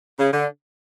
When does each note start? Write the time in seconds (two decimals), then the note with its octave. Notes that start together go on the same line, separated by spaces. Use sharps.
0.19 C#3
0.33 D3